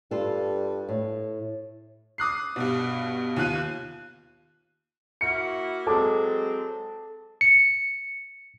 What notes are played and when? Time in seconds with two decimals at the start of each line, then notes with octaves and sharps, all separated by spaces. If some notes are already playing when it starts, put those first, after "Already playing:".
0.11 G2 F4 A4
0.89 A2
2.18 D6 D#6 F#6 C7
2.56 G2 B2
3.36 D#2 F4 F#6 D#7
5.21 A#3 E4 F#4 C#7
5.87 F#3 G#3 C4 A4 A5 D6
7.41 C#7